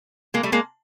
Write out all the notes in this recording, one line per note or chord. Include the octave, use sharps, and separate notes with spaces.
G#3 A#3
G3 A3
G#3 A#3